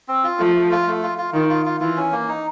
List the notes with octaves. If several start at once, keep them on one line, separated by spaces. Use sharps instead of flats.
C4
F4
F3 A3
A3
F4
A3
F4
F4
D#3 F4
F4
F4
E3 F4
C#4
A#3
D#4